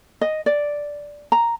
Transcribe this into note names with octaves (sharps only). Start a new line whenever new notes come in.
D#5
D5
A#5